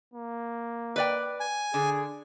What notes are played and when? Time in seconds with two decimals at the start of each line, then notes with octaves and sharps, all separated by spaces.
0.14 A#3
0.96 B4 D5 G5
1.40 G#5
1.74 D3 G#4